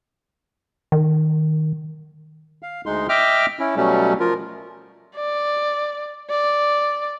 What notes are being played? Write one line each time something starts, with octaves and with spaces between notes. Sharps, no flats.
D#3
F5
D2 G#3 D#4 C6
D#5 E5 G5 D6 F6
C#4 E4
B2 F#3 G3 A3 C#4
F3 F4 A#4
D5
D5